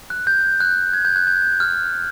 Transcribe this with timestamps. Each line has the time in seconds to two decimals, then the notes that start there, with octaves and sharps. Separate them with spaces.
0.10 F#6
0.27 G6
0.60 F#6
0.93 G#6
1.05 G6
1.16 F#6
1.27 G6
1.60 F6